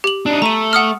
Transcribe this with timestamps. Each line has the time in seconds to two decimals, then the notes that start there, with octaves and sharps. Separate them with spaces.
0.04 G4 F#7
0.26 D4 D#4
0.42 A3 A#5 D#7
0.73 F#5 D#6 F6